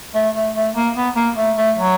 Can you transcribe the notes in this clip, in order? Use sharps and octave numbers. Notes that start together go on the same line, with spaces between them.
A3
A3
A3
A#3
B3
A#3
A3
A3
F#3